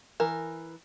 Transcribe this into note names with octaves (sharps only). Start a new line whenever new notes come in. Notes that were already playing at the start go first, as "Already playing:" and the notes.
E3 A#4